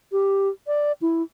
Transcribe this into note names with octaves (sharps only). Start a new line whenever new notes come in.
G4
D5
E4